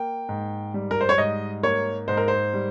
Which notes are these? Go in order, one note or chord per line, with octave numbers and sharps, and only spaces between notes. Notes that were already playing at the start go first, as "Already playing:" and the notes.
Already playing: A#3 G5
G#2
G3
A#4
C5
C#5
G#2 D#5
A#3 C#5
G#2 C5
A#4
C5
G3